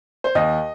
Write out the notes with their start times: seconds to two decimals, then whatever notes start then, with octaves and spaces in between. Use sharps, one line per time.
0.24 C5
0.35 D#2 D#5